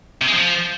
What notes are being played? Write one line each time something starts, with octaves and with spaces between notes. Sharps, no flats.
C3
G#3
F3